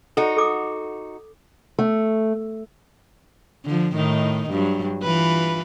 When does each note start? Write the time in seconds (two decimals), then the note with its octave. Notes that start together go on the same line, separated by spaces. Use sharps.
0.17 D#4 F#4 A4
0.37 A4 D6 D#6
1.79 A3
3.65 D3 F3
3.94 A2 D#3 D#4
4.51 G2 F#3
5.04 E3 F4 B4